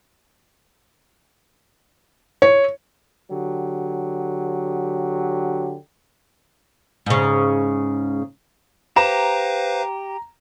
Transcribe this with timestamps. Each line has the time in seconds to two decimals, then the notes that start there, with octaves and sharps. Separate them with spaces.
2.42 C#5
3.31 D3 F#3 G4
7.06 G#2 C#3
8.96 G4 B4 C5 F5 A#5 E7